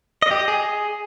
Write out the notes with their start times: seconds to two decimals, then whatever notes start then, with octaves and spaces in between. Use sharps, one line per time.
0.22 D#5
0.31 G4
0.39 D#5
0.48 G#4